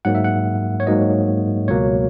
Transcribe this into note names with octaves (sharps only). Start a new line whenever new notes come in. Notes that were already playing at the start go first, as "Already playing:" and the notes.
G#2 F#3 A#3 F#5
E5
F#5
C#5
G#2 F#3 A#3 D#5
C#2 B2 F#3 A#3 C#5